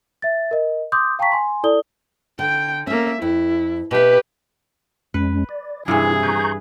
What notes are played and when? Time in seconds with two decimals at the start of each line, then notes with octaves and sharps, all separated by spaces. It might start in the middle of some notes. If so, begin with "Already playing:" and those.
0.22 E5 A6
0.51 A#4 D#5
0.92 C6 D6 D#6 G6
1.19 F5 G5 A5 A#5 C#6 B6
1.32 G#5 C6
1.64 E4 A4 D5 D#6 G7
2.39 D3 G5
2.87 A3 A#3 C#4 E5
3.22 F2 E4
3.91 B2 G4 B4 E5
5.14 F2 G#3 C#4 B4
5.49 D5
5.88 G2 C3 E3 E4 G#4
6.23 B4 A#5 C#6 G6